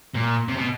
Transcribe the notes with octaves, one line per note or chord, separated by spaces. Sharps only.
A#2
C3
B2